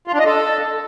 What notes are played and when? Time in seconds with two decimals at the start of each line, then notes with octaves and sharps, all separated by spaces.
0.08 F4
0.14 D4
0.19 D#5
0.25 A4